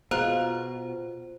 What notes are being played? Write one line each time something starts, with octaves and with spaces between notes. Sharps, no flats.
B2 F4 G#4 C5 A#5 F#6